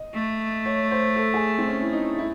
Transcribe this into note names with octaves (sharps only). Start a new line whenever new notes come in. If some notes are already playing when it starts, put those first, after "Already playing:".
Already playing: D#5
A3
C#5
C5
A4
G#4
C4
C#4
E4
D#4
E4